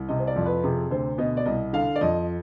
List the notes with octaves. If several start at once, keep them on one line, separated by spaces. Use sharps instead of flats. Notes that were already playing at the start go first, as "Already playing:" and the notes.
Already playing: C2
C3 D#5
C5
D5
F2
B4
C3 G#4
D2 C5
B2 D#5
D5
C2 D#5
D3 F5
D5
F2 D#5